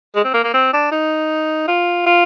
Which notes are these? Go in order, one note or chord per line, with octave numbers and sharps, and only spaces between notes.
G#3
C4
A#3
A#3
C4
D4
D#4
F4
F4